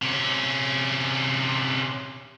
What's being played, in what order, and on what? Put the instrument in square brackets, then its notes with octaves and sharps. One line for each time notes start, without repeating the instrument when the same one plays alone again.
[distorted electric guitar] C3 C#4